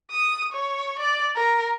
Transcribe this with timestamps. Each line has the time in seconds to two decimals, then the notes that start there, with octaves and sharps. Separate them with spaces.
0.11 D#6
0.53 C#5
0.99 D5
1.36 A#4